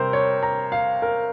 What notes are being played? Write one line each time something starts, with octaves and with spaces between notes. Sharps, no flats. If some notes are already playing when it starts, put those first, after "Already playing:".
Already playing: C3 G3 A#4 C5
C#5
A#5
F5
A#4